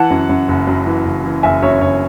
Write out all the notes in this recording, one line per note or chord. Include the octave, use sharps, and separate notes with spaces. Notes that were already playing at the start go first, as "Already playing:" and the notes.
Already playing: E3 F#5 A5
F#2
F#2
F#1
F#2
E3
F#1
E3
F#1 E5 G#5
F#2 C#5 E5
F#1 C#5